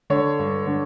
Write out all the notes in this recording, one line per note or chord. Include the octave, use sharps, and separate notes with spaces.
D3 C#5
G2
D3